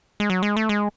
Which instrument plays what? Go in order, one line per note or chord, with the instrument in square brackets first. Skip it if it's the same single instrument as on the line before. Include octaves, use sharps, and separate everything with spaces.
[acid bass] G#3
F#3
G#3
A3
G#3